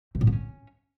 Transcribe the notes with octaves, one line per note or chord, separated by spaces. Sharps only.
C3
A2
B3
C#4